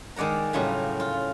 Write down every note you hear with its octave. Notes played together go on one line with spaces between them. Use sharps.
D#3 G#3 D5 F#5 A#5
A2 C#3 F#3 G3 F4 F#4
F4